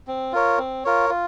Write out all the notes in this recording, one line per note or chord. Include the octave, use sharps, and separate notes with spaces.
C4
F4 A#4 C#5
C4
F4 A#4 C#5
F4